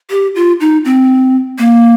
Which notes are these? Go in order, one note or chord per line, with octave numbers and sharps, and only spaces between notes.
G4
F4
D#4
C4
A#3